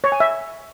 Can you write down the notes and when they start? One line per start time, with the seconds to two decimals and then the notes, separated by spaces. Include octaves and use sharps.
0.04 C#5
0.12 G#5
0.20 E5